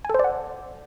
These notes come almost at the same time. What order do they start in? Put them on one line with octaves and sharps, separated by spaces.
G#5 A4 C5 D5 F#5